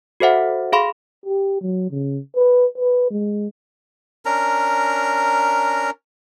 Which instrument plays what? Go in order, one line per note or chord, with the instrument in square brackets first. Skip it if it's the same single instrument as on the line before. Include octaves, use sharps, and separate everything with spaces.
[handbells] F#4 A4 C5 E5 F#5
G#4 F5 B5 C6
[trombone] G4
F#3
C#3
B4
B4
G#3
[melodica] C#4 D4 A#4 A#5